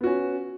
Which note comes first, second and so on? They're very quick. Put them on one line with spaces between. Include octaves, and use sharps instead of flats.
B3 F#4 C#4